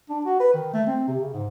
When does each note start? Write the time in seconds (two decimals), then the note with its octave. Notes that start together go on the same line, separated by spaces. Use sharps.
0.10 D4
0.25 F#4
0.40 B4
0.54 D#3
0.73 A3
0.87 C4
1.08 C3
1.20 C#3
1.33 G#2